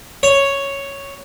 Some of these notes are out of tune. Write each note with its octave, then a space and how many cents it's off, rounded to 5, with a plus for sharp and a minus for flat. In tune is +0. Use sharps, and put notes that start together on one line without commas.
C#5 +0